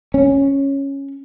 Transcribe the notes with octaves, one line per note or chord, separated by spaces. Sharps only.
C#4